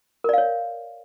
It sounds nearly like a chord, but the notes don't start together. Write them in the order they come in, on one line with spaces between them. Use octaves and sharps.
A#4 D5 F5 C#5